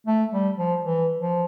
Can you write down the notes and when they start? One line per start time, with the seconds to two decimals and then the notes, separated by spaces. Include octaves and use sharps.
0.07 A3
0.32 G3
0.57 F3
0.82 E3
1.20 F3